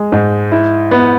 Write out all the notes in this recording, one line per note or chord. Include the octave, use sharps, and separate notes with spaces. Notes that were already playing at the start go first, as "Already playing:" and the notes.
Already playing: G#3
G#2
E4
B3